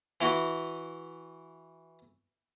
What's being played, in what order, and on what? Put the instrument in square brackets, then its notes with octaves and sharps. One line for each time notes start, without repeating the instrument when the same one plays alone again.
[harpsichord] E3 E4 F#4